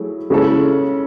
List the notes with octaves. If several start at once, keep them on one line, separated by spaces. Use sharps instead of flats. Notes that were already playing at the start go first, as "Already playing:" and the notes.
Already playing: F#3 A3 E4 G#4
C#3 G#3 C#4 E4 A4